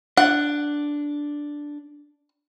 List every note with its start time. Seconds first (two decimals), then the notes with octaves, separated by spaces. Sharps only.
0.17 D4 F#5